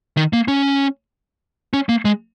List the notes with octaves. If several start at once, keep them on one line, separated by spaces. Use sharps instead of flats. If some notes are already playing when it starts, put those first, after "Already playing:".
D#3
A#3
C#4
C#4
A#3
G#3